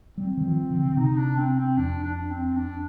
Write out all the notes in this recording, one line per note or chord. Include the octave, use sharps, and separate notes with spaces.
G3 C4
D#3
F3
D3
D3
C3 D#4
D4
C4
C4
F2 D4
D4
C4
D4